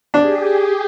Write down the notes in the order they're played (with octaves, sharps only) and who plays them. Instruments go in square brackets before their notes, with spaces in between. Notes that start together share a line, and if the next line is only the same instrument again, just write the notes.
[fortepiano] D4 [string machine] G4 G#4